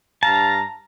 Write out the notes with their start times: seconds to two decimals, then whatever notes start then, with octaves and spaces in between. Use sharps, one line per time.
0.23 G2 F5 A5 A#5